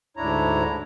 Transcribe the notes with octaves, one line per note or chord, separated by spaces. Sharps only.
D2 G#2 D4 E4 C#5 A#5